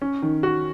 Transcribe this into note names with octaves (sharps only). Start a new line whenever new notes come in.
C#4
D#3
F#4